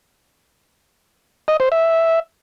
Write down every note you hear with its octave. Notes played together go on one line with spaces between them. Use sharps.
D#5
C5
E5